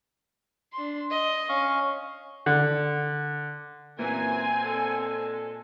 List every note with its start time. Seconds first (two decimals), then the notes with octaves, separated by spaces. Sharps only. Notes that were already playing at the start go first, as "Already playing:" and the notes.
0.73 D4 C6
1.11 D#5
1.49 C#4 F5 C#6
2.46 D3
3.98 F#2 A#2 E3 A#3 C4 G#5
4.64 G#3 D4 F4 A4